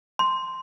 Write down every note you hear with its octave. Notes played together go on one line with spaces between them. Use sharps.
C6